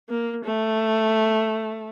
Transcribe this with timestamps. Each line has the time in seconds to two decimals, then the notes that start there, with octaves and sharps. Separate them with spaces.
0.10 A#3
0.45 A3